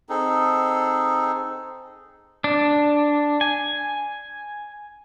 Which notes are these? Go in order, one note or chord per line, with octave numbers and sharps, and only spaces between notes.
C4 D#4 G#4 A4
D4
G#5